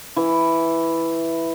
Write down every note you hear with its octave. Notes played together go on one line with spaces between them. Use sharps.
E3